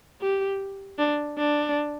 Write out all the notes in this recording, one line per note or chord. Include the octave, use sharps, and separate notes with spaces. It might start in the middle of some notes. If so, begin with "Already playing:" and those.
G4
D4
D4